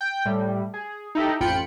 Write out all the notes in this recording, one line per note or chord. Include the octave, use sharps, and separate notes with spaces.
G5
A2 G3
G#4
D#4 E4 G4 A4
A1 F2 F4 G5 B5 C#7